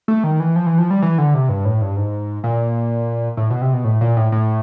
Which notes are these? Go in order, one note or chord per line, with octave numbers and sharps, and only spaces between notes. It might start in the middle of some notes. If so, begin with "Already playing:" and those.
A3
D#3
E3
F3
E3
F3
G3
E3
D3
C3
G2
A2
G2
G#2
A#2
A2
B2
C3
B2
A2
A#2
A2
A2